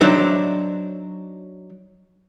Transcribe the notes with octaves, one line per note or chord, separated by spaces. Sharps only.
F#3 D4 D#4 C5 E5